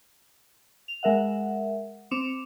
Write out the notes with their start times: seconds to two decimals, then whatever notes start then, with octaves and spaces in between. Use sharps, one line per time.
0.88 F7
1.03 G#3 A#4 E5 F#5
2.11 C4 D6 C#7 E7 F7